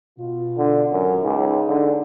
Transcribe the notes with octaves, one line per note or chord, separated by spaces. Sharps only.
B2 F4
D3
G#1 F#2 F#3 A#4
C#2 D#4 G#4
D3